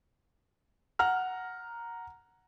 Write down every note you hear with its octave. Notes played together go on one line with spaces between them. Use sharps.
F#5 A#5 F6